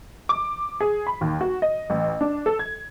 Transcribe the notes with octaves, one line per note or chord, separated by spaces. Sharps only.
D6
G#4
B5
D#2
F#4
D#5
A1
D4
A4
G#6